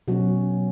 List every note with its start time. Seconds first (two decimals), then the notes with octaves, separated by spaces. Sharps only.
0.08 B2 F#3 C#4 F#4